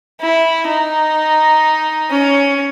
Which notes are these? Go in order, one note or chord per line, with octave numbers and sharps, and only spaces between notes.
E4
D#4
C#4